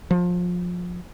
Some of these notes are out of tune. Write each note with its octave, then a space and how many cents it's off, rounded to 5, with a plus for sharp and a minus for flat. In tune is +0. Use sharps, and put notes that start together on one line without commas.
F3 +25